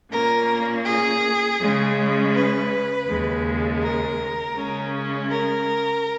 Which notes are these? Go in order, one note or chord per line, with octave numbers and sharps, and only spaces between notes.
A#2 A#3 C#4 A#4
G#4
C#3 G#3 C#4
B4
D#2 C#3 G#3
A#4
C#3 G#3 C#4
A#4